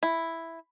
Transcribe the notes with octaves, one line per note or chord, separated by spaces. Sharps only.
E4